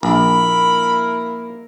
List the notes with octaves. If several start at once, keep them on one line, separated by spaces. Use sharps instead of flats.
A#1 A#3 E4 A#4 B5